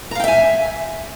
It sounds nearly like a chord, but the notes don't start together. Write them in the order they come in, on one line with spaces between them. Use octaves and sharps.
A#5 F5 G5 E5 G#5